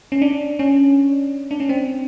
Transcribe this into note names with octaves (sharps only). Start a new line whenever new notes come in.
C#4
D4
C#4
D4
C#4
C4